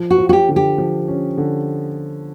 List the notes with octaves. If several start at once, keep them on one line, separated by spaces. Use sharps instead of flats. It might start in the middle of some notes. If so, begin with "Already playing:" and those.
Already playing: F3
F#4
F3
F#4
G4
D3
G4
F3
C#4
D3